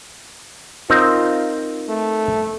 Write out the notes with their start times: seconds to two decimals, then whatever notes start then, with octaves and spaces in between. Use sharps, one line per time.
0.90 C4 D#4 F4 A#4
1.89 A3